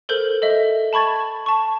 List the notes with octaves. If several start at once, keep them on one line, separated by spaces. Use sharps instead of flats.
A4 A#4 C5 G6 F#7
A4 D#5 E5
A5 B5 C#6 G#6 A6
A5 C#6